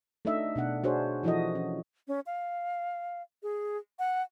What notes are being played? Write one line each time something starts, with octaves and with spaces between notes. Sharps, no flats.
A3 D4 D#4 D#5 E5
B2 D4 F#5
D4 F#4 G#4 C5 C#5
E3 F3 E4 F#4 A4 D#5
C#4
C#4
F5
G#4
F#5